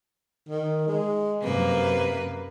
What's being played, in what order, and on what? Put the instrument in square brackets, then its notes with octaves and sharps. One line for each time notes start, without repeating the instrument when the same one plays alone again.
[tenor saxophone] D#3
G#3
[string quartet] F#2 A#3 B4 [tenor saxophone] C3